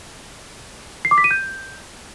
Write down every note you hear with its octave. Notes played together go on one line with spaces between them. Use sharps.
C7
D6
B6
D#7
G6